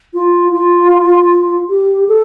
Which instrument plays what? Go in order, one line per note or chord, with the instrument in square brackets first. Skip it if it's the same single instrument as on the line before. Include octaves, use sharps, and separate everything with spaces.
[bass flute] F4
F4
G4
A4